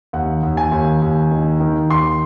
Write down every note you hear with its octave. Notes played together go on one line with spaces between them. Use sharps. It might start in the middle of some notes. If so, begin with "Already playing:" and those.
D#2 F#5
D#2
G#5
D#2
D#2
D#3
D#3
D#2 C6